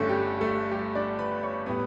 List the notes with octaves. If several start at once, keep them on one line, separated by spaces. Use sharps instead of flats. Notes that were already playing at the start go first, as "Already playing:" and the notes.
Already playing: G1 G2 D3 A3 C#4 A4
G3 G4
A3 A4
G3 G4
D4 D5
B4 B5
C#5 C#6
A2 G3 B3 B4 B5